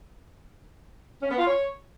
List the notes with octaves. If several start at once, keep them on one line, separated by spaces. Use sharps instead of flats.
C#4
B3
F4
C#5